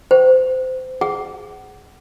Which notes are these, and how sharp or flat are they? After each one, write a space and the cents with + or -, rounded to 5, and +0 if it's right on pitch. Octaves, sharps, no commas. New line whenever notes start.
C5 -25 G5 -40
G#4 +0 F#5 +25